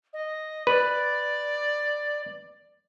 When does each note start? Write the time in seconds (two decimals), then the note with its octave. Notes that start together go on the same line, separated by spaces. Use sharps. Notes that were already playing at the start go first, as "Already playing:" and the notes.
0.13 D#5
0.67 B4 D5